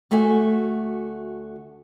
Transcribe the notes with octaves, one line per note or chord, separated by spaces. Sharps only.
D2 A3 F#4 E5 G#5